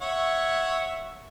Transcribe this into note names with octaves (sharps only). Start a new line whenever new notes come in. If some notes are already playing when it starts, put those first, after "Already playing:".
C#5 E5 F#5